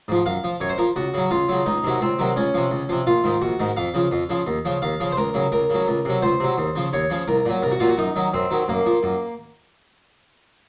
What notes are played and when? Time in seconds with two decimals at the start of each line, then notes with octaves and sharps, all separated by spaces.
0.08 G#2 F3
0.26 F#2 F5
0.44 F3
0.60 F#2 C#5
0.69 C5
0.78 F3 A#4
0.96 C#2 F#4
1.14 C#3 F#3
1.31 C#2 F4
1.49 C#3 F#3
1.66 C#2 D#4
1.84 C3 D#3 F#3
2.01 C#2 C4
2.19 C3 D#3 F#3
2.36 C#2 C#4
2.54 C3 F3
2.71 C#2
2.89 C3 F3
3.07 A#1 F4
3.24 G#2 D#3
3.42 A#1 F#4
3.59 G#2 D#3
3.77 F2 F5
3.94 C#3 F3
4.11 F2
4.29 C#3 F3
4.47 D#2
4.65 C#3 F3
4.82 D#2 F5
5.00 C#3 F3
5.12 C5
5.17 C#2 A#4
5.34 C#3 F#3
5.52 C#2 A#4
5.70 C#3 F#3
5.88 C#2
6.05 C3 F#3
6.22 C#2 C5
6.40 C3 F#3
6.58 D#2
6.75 C#3 F3
6.93 D#2 C#5
7.10 C#3 F3
7.28 C2 A#4
7.46 A#2 F#3
7.62 C2 A#4
7.72 F#4
7.80 A#2 F#3 F4
7.89 F#4
7.98 F#2 D#4
8.16 D#3 F#3
8.34 F#2 C4
8.51 D#3 F#3
8.68 F#2 A#3
8.86 F3
9.03 F#2